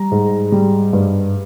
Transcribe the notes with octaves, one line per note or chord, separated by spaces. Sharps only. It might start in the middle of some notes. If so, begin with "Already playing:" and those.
Already playing: G3 A#5
G#2
G3
G2